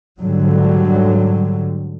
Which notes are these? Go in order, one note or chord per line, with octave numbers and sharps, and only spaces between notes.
G#2 D3 F#3 G3